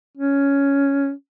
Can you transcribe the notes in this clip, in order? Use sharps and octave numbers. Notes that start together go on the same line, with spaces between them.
C#4